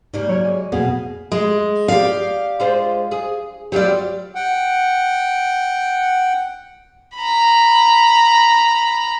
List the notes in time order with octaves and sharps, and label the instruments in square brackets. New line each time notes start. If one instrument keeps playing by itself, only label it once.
[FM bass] G#2 [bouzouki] C#3 G3 A#3
[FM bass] F#3 [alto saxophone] C#5
[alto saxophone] G#3
[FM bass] F2 [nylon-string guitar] B2 [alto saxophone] G#4 [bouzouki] F5
[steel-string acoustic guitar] G#3
[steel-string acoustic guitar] G4 F5 [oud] D5
[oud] G#3 F4 C5
G#4
[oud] F#3 G3 F4 [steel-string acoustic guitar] G4 D5
[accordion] F#5 G5
[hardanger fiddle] A#5 B5